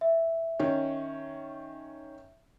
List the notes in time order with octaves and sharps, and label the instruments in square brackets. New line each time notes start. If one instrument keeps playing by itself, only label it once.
[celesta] E5
[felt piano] D#3 C#4